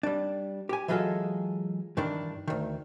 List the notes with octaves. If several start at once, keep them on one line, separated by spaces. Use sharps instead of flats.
G3 D4
G4 G#5
E3 F#3 G#3 F4 G#4 A4
G2 D#3 E3 D4
D2 D#3